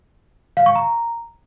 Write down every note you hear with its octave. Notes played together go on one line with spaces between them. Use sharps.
F5
C#6
A#5